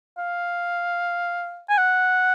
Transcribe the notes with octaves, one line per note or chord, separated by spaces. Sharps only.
F5
G#5
F#5